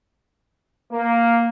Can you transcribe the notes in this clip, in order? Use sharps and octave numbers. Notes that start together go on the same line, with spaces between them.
A#3